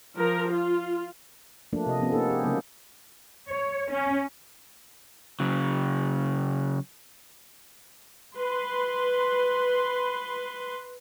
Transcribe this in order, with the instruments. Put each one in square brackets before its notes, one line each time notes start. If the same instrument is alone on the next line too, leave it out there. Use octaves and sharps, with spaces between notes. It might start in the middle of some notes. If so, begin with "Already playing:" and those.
[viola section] F3 A#4
F4
[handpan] F3 A3 A#3 D4
C3 D#5
F3 B3 C#4
A#3 D#4 A4
G4 G#4
C#3 F#3 G#3 A#3
[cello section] C#5
C#4
[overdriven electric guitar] C#3 F#3
[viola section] B4 C6